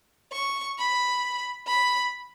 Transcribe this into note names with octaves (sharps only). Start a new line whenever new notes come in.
C#6
B5
B5